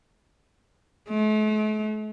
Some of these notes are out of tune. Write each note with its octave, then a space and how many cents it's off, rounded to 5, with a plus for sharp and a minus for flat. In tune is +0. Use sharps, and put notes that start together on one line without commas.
A3 -45